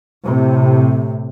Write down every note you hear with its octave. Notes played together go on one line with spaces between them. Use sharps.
A2 C3